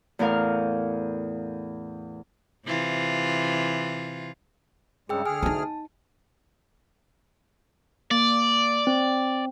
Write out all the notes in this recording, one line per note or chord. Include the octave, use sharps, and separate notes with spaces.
E2 A2 A#4 F5
C3 E3 F4
G2 C#3 G#3 G#4 G5 E6
D2 G#4 G#5 F6
D#4 F4 A5
A#3 D5
C4